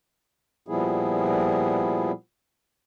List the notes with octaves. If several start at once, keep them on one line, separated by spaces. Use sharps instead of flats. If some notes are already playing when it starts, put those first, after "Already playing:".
A#2 F3 G3 B3 E4 G#4